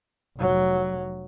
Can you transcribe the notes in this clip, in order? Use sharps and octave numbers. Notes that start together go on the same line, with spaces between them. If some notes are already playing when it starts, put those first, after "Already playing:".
F1 F#3